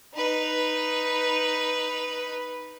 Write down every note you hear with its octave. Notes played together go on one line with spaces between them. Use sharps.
D#4 B4